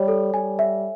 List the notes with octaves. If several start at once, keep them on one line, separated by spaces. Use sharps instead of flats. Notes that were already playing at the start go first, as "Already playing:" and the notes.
Already playing: G3 C#5
A4
G3 G#5
E5